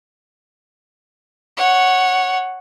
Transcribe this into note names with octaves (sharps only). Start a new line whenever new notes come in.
C#5 F#5